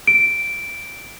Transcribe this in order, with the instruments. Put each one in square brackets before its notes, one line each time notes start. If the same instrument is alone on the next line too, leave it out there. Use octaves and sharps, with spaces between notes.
[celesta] D7